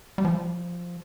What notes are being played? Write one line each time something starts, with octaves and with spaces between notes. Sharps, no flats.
G3
F3